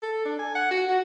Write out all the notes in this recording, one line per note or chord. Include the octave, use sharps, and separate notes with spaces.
A4
D4
G#5
F#5
F#4
F#4